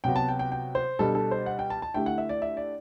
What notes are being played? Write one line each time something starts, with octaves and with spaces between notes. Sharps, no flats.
C3 F#3 B3 F#4 G5
A5
G5
G5
G5
C5
B2 G3 D4 G4 A4
A4
C5
F#5
G5
A5
A5
D3 A3 E4 G4 G5
F#5
E5
D5
E5
D5